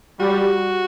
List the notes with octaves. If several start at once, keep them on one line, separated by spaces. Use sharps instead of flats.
G3 F#4